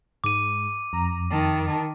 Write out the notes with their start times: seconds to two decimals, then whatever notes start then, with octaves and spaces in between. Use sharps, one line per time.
0.24 G#2 D6 D#7
0.93 F2 A#5
1.31 D#3 A5